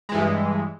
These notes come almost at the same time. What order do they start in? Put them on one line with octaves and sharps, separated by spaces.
G#3 E3 G2